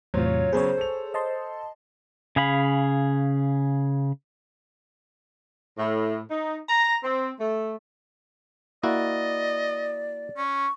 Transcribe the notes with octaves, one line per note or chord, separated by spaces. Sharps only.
E2 A2 C3 F#3 F4 C5
C#5
C#3 F#3 B3 G#4 C5 C#5
A4 F7
D#5 A5 C6
C#3 G#4 F5 B5
A2
D#4
A#5
C4
A3
A#3 E4 F#4 D5 D#5
C#4 C#6